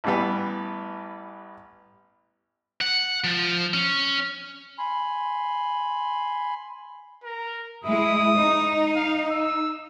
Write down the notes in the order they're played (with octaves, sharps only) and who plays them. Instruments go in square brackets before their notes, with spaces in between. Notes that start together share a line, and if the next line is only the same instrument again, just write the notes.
[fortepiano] A1 E3 G3 B3
[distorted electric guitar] F#5
F3
C#4
[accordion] G#5 B5 C6
[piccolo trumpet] A#4
[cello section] G#3 E4 [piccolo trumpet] D#6
[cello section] D#4
[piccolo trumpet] F5
E6